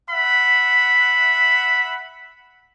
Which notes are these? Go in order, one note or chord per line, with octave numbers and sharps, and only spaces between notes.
E5 F#5 B5